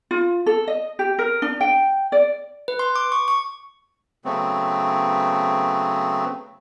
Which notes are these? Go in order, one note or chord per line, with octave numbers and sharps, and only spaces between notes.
F4
A4
D#5
G4
A#4
D4
G5
D5
B4
C6
D6
C#6
C#6
C#3 F#3 A3 B3 C4